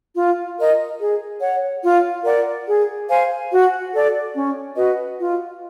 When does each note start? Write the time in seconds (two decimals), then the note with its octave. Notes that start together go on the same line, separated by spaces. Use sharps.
0.15 F4
0.57 A#4 D#5
0.99 G#4
1.41 C#5 F#5
1.82 F4
2.25 A#4 D5 F#5
2.67 G#4
3.08 C5 F5 G#5
3.51 F#4
3.93 A4 D5
4.34 C#4
4.76 F#4 B4 D#5
5.18 F4